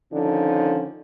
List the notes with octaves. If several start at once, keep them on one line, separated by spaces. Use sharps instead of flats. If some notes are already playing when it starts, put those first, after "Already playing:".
D3 D#3 F3 C#4 D#4